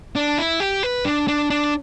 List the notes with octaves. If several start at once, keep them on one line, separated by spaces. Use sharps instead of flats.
D4
E4
G4
B4
D4
D4
D4